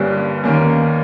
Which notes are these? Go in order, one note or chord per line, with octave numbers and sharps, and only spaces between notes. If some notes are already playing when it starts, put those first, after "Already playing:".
Already playing: G1 G2 G3 A#3 C#4
D#2 D#3 A#3 C#4